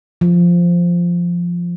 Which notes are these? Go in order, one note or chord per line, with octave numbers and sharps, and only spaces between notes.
F3